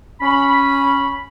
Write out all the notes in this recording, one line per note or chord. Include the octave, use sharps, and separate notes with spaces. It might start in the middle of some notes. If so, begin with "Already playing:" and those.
C#4 B5